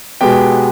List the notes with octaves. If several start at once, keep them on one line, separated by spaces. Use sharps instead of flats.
B2 G#3 B3 G4 G5